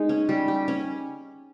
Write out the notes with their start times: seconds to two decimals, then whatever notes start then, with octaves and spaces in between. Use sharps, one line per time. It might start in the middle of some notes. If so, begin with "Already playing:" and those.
Already playing: G#3 D#4
0.09 C#4
0.29 G3
0.48 G4
0.68 C#4